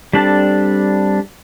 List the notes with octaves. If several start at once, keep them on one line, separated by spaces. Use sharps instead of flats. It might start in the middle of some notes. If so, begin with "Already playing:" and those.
G3 C4 D4 A4 A5